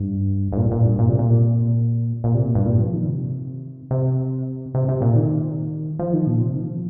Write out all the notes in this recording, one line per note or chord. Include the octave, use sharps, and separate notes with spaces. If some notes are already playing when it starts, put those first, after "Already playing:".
Already playing: G2
G2
A#2
A#2
G2
A#2
C3
A#2
A#2
C3
A#2
G2
A#2
F3
D#3
C3
C3
C3
C3
A#2
D#3
F3
D#3
A#2
C3
D#3
F3